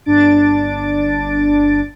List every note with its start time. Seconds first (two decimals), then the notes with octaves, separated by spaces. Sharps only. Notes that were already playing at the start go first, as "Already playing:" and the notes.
0.05 G1 D4 A6 D7